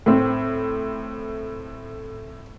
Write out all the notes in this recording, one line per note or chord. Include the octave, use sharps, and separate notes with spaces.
A2 C4